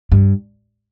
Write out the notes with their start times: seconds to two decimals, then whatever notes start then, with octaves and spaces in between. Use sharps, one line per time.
0.12 G2